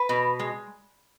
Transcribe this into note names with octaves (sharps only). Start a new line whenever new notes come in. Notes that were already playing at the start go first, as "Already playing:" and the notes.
Already playing: B4
B2
G#3